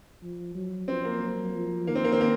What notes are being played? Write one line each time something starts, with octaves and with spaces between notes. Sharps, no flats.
F3
F#3
F3 C4
A#3
F#3
F3
D#3 A#3
C4
A#3
C4
A#3